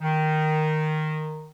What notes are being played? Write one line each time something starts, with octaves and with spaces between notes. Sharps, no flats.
D#3